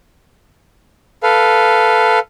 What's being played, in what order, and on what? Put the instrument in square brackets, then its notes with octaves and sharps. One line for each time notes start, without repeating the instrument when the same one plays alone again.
[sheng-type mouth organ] A4 B4 F5